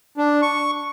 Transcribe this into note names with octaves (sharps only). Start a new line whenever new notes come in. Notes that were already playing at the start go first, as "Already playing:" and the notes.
D4
C#6